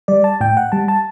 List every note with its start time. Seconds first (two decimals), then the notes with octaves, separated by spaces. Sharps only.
0.08 G3 D5
0.24 A5
0.41 A2 G5
0.57 F#5
0.72 G3 A5
0.88 A5